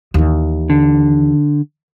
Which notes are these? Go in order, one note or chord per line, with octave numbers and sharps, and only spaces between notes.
D#2 E3
D3